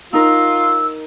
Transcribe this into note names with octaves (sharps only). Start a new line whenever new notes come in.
D#4 F4 A#4 E6